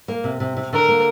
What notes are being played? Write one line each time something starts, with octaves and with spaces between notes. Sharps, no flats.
A#3
C3
C3
C3
D3 A#4
A#3